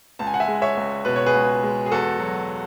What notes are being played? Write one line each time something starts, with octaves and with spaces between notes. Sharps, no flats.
C#2 A5
G#5
F#5
E5 G#5
G#3
C#5 E5
C#2
B2 B4
C#5
G#4 B4
C#2
G#3
G#4
E2 F#4 A4
F#3